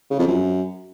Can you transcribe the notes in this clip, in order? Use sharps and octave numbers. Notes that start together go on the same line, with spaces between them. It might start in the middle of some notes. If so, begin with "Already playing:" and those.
C#3
F2
F#2